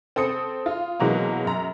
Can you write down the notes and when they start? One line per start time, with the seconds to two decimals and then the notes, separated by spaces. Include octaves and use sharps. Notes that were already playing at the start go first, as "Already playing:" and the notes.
0.16 C4 A4 D#6 C#7
0.66 F4
1.00 B2 E3 F#3 G#3 A#3
1.45 F#2 A#5